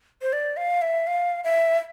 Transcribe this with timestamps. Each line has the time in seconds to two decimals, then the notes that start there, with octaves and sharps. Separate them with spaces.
0.22 C5
0.33 D5
0.57 F5
0.82 E5
1.07 F5
1.44 E5